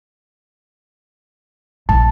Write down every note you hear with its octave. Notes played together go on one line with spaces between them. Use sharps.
A#1 A5